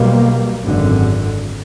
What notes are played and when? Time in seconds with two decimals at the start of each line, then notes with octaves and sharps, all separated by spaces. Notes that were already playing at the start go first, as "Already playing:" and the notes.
Already playing: B1 B2 G3 A#3
0.62 G#1 F#2 D3